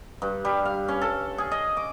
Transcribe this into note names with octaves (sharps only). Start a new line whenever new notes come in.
G2
G3
F5
C#4
A4
G#4
D#5
D6